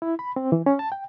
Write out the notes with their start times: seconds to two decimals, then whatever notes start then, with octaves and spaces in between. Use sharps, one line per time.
0.02 E4
0.19 B5
0.36 C4
0.52 E3
0.66 C#4
0.79 A5
0.92 G5